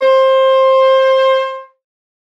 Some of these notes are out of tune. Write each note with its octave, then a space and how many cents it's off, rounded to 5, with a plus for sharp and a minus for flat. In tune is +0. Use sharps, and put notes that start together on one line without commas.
C5 +20